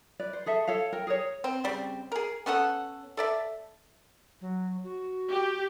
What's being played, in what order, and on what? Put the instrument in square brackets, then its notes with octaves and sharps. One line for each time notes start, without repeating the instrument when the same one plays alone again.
[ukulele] B4 D5
C5
G#4 A4 E5
A4 C#5 F5
A#4 G5
G#4 A#4 C#5
[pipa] C4
C#3 G3 C4
G#4 A#4
B3 C#4 A4 F#5
A4 D5 E5
[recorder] F#3
F#4
[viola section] G4